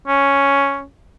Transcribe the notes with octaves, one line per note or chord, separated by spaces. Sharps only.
C#4